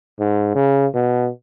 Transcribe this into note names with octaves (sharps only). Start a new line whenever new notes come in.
G#2
C#3
B2